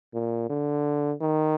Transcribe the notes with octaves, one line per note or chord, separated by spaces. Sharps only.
A#2
D3
D#3